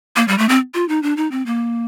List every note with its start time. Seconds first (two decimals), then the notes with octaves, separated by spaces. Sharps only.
0.16 A#3
0.28 G3
0.38 A3
0.49 C4
0.74 F4
0.89 D#4
1.03 D4
1.17 D#4
1.31 C4
1.46 A#3